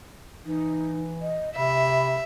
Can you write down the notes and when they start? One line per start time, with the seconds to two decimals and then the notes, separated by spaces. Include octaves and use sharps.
0.45 E3 D#4
1.22 D#5
1.56 C3 E5 B5